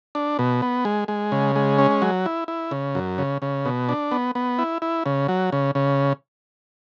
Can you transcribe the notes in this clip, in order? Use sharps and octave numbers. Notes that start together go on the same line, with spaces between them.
D4
B2
B3
G#3
G#3
C#3
G#3
C#4
F#3
E4
E4
C#3
F#2
C#3
C#3
B2
D4
B3
B3
E4
E4
C#3
F#3
C#3
C#3